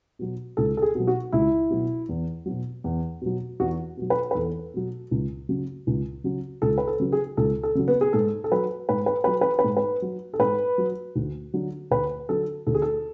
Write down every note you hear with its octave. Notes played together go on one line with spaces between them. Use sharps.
B2 F#3
C#2 A4
A4
G#4
B2 F#3
F#4
C#2 E4
B2 F#3
E2
B2 F#3
E2
B2 F#3
E2 F#4
B2 F#3
B4
B4
E2 A4
B2 F#3
C#2
C#3 F#3
C#2
C#3 F#3
C#2 A4
B4
A4
C#3 F#3
G#4
C#2 A4
A4
C#3 F#3
B3
G#4
G#2 A4
A4
F#3 B4
G#2 B4
B4
F#3 B4
B4
B4
G#2
B4
F#3
A4
G#2 B4
F#3
D2
D3 F#3
D2 B4
D3 F#3 A4
D2 A4
G#4
A4